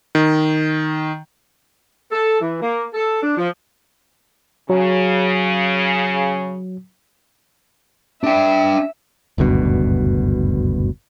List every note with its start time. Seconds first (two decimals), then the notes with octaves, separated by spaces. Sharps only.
0.15 D#3
2.12 A4
2.40 E3
2.62 A#3
2.94 A4
3.23 D4
3.38 F3
4.70 C#3 F#3
8.23 D4 E5 G5
9.38 F#1 D2 G2 B2